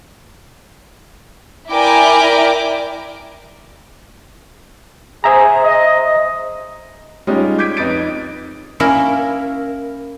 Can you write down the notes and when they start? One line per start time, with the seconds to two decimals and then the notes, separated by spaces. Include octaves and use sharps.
1.70 E4 A#4 D5 G5 G#5 D6
5.24 G#4 C5 E5 A#5
5.63 D#5
7.27 G3 G#3 C#4 D#4 F4
7.58 D6 G6 G#6 B6 D7
7.77 F2 D#4 B4 A6 D7
8.80 A#3 C#4 E4 A#4